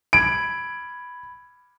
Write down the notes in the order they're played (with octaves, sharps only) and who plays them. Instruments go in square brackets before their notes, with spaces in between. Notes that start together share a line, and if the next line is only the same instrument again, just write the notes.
[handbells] B5 G#6 [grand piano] D7